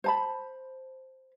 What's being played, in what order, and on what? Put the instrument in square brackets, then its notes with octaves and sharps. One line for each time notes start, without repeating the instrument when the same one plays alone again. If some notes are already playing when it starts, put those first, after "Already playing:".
[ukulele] C5 A5 B5